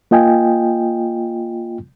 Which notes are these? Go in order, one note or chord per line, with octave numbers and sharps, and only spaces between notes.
A#3 F4 D#5 G5 G#5